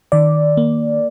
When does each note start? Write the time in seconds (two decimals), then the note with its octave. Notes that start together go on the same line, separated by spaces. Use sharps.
0.12 D#3 D5
0.57 A#3